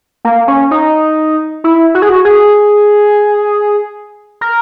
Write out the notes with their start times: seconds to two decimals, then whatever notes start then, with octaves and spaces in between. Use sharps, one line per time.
0.25 A#3
0.48 C#4
0.71 D#4
1.64 E4
1.95 F#4
2.02 G#4
2.09 F#4
2.25 G#4
4.41 A#4